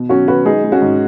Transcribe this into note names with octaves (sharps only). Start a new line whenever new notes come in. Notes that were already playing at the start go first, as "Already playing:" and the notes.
Already playing: B2
F#3 C#4 F#4
F#3 F#4 B4
G#3 D#4 G#4
G#3
C#4 F#4
G#2